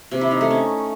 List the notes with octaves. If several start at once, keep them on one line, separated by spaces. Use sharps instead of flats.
C3
E4
D#4
A3
C#4